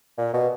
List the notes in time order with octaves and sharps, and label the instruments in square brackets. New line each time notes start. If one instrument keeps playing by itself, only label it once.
[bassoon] A#2
B2